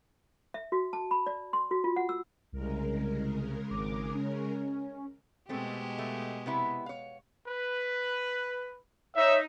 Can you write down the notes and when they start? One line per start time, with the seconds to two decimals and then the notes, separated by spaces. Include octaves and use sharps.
0.54 E5
0.72 F#4
0.93 A5
1.11 B5
1.26 D5
1.53 C6
1.71 F#4
1.84 F4
1.96 F#5
2.09 E6
2.52 C2 C#3 G#3 A#4
3.70 G#1 D6
4.15 C#4
5.49 B2 G#3 A3 C4 G4 A4
5.98 A3
6.46 C3 B3 E4
6.86 C#5 F5
7.47 B4
9.16 D#4 C#5 E5